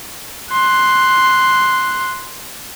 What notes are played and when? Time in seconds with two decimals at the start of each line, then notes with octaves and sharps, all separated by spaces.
0.53 C6 F#6